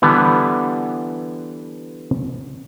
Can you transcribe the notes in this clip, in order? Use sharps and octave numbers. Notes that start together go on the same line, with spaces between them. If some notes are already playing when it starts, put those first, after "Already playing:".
D3 E3 G3 B3